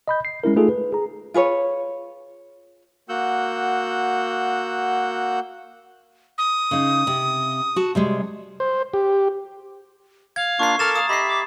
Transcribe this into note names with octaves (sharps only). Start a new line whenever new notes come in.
D#5 B5 G6
C7
G#3 C#4 E4 A#4
A3 D#4 F4 G#4 A4
B4
G#4 A#5
F4 G#4 B4 C#5
A#3 F#4 F#5 E6 G6
D#6
C#3 D#4
C3
F#4 A5
C3 G3 G#3
C5
G4
F5 G#6
A#3 D4 F4 C#6 C7
A4 A#4 A#5 D6 F6 A6 E7
F5 D#6
G4 D#5 E5 B5 C7
D6